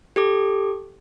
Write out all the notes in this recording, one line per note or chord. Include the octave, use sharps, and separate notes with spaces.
G4 A4 D6